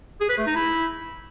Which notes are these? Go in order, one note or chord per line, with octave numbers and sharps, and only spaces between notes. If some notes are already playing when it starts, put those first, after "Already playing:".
G#4
B4
A3
D#4
E4